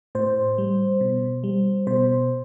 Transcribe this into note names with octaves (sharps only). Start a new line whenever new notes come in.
A2 C5
G3
B2
G3
B2 C5